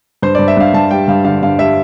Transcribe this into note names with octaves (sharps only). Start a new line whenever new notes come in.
G2 C5
G2 D5
E5
G2 F5
G2 A5
G3 G5
G2 F5
D3 F5
G2 F5
G3 E5